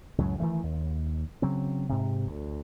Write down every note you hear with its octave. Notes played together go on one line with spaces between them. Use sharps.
C#2 F#2 A2 F#3
D#3 E3 G#3 A3
D#2
C#3 F#3 C4
G#2 C3
D2